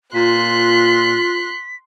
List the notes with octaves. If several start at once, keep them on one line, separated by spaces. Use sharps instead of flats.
A#2 F4 C6 F#6 B6